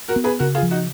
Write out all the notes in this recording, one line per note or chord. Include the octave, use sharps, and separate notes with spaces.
F#4 A#4
B3
G#4 B4
C#3 F#4 A#4
F4 G#4
F3
D#4 F#4